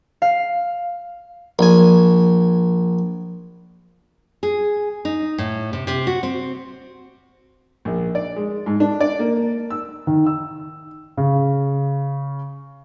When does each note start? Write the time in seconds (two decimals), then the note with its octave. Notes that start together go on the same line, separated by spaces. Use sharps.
0.22 F5
1.59 A#1 G#5
4.43 G#4
5.05 D#4
5.38 A2
5.73 C3
5.87 C3
6.07 F#4
6.23 C4
7.85 A#1
8.15 D5
8.36 G#3
8.66 G#2
8.80 D4
9.01 D5
9.19 A#3
9.70 E6
10.07 D#3
10.27 E6
11.17 C#3